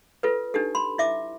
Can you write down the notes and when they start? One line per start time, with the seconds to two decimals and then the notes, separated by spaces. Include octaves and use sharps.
0.23 F4 A4 B4
0.54 D4 D#4 G4 A4
0.75 B5 C6
0.98 E4 E5 D6